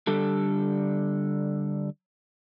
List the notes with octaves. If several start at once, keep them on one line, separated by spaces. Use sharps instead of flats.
D3 G3 A4